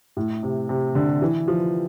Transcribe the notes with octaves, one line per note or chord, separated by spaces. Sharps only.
A2
C3
C3
D3
E3
F3